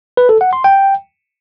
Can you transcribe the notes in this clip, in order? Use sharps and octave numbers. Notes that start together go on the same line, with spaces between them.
B4
A4
F#5
C6
G5